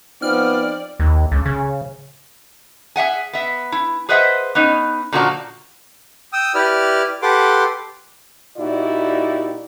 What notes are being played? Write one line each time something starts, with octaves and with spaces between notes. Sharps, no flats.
F3 B3 C4 D#4 D5 F6
D#2
C#2
C#3
G#4 E5 F#5 G#5
B3 E5
E4
G#4 B4 C5 D#5 E5 F#5
B3 C#4 D#4
A#2 D3 F3 A#3 F#4 D5
G5 D#6 E6
E4 G4 B4 D5 F6
G4 A4 B4 F#5 C6 D6
A#2 D#4 E4 F#4 G4 D5